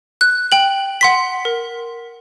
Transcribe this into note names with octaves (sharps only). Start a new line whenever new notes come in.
F#6
G5 F#7
F#5 C6 B6
A#4